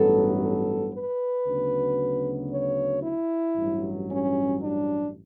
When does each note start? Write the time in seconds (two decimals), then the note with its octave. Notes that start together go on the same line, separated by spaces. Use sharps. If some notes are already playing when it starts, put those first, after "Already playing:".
Already playing: A1 G2 F#3 B3 A4
0.41 A4
0.93 B4
1.47 D2 C#3 F#3 B3
2.52 C#5
3.03 E4
3.56 A1 G2 F#3
4.09 C#4
4.61 D4